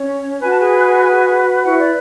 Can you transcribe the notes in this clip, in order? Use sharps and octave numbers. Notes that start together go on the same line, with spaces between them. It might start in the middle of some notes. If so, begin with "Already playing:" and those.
Already playing: C#4 C#5
F#4 B4 G#5
A5
G#4 G#5
E4 F#4 B4 F#5
D5